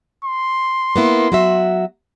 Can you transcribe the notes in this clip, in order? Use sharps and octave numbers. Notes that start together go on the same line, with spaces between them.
C6
A#3 B3 E4
F#3 F#4 E5